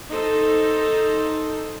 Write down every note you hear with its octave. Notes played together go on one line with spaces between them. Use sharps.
D#4 A4 C5